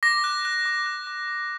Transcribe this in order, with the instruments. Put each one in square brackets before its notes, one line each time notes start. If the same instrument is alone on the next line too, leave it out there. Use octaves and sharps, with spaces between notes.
[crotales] D6 A#6
F#6
F#6
D6
F#6
D6
D6